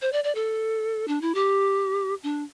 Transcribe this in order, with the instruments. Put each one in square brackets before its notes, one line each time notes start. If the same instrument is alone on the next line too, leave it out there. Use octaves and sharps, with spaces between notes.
[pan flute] C5
D5
D5
A4
D4
E4
G4
D4